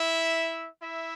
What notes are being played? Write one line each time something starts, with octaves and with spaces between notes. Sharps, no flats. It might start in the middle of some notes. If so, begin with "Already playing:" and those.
Already playing: E4 E5
E4 E5